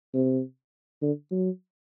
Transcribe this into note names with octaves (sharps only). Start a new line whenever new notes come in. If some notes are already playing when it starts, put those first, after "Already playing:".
C3
D3
F#3